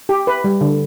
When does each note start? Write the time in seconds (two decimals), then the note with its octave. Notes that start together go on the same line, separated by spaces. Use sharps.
0.09 G4
0.27 B4
0.44 G3
0.61 D3